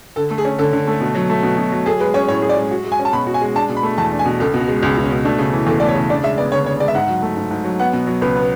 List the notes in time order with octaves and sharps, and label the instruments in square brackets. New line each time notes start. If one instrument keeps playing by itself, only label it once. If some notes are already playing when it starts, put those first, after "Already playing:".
[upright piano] D3 [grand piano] A4
[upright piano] A3
[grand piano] G#4
[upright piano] C#4
[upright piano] D3 [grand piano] A4
[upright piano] D3
A3
B2
F#3
A3
B2
B2
F#3
[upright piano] G#4 [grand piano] A4
[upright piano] G#3 [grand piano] B4
[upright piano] C#4 [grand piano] C#5
[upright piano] A2 [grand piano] C#5
[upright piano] G#4
[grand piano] D5
[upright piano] G#3
F#4
G#3
[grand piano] G#5
[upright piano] C#4
[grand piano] A5
[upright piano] B2 [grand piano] B5
[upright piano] F#4
[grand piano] G#5
[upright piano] G#3
[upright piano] D4 [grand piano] A5
[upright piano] B2
[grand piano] B5
[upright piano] A3
[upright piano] E2 [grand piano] A5
[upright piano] D4
[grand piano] G#5
[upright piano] B2
[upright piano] C#2 [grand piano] A4
[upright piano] B2
[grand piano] F#4
[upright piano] G#3
[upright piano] C#2 [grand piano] G#4
[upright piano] C#2
[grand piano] C#4
[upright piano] B2
[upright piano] A3 [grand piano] D4
[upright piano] C#3
E3
[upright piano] E2 [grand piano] A4
[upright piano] A3 [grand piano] D5
[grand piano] C#5
[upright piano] C#3
[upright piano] D4 [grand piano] D5
[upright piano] G#3 [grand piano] E5
[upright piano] B3 [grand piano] D5
[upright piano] D3 [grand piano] C#5
[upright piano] D4 [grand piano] C#5
[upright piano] G#3 [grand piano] D5
[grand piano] E5
[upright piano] G#2 [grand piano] F#5
[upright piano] F#3
A3
G#2
G#2
F#3
[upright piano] B3 [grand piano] F#5
[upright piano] B2
F#3
[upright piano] C#2 [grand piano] B4
[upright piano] B3